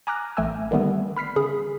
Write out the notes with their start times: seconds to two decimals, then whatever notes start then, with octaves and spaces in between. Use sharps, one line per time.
0.07 G#5 A#5 D6 F6 F#6 A#6
0.37 A1 A3 G5 G#5 E6
0.71 D3 D#3 G3 A3 B3
1.17 B5 F6 B6 C7
1.36 C#3 G#4 B5